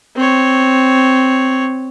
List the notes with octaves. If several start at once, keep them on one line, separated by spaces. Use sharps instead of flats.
C4 C#5